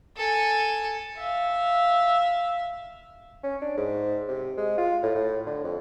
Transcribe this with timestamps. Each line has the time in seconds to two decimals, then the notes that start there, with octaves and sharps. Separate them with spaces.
0.17 A4 G#5
1.18 E5 F5
3.43 C#4
3.62 D4
3.78 G#2
4.28 C3
4.58 G#3
4.78 F4
5.03 A2
5.15 A2
5.46 D3
5.64 F2